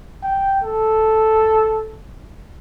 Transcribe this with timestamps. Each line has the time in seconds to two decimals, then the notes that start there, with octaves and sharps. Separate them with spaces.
0.23 G5
0.63 A4